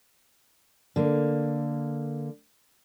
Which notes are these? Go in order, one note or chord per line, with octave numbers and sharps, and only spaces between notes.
D3 A#3